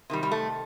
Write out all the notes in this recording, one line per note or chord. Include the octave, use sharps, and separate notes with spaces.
C3 D#3 G3
G3
A3